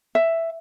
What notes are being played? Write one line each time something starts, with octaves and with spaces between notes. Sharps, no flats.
E5